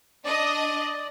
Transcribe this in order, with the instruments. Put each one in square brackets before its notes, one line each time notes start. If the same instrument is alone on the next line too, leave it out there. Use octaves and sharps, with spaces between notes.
[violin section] D4 D#5 [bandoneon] D5